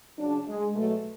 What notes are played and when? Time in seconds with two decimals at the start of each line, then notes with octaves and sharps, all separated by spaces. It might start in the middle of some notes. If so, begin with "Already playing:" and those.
0.19 C#3 F#3 D4
0.47 G#3
0.75 B2 F#3 A3